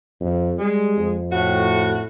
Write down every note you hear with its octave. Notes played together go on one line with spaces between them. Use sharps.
F2
G3 G#3
F2
A2 F#4